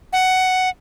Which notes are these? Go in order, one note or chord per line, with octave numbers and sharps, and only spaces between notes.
F#5